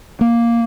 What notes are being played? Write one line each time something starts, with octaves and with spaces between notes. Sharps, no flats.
A#3